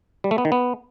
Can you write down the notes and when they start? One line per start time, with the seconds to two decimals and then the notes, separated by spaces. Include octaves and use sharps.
0.24 G3
0.31 A3
0.38 B3
0.45 D#3
0.52 B3